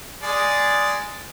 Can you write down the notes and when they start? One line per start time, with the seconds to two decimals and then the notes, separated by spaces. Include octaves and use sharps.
0.23 G#3 G#4 D5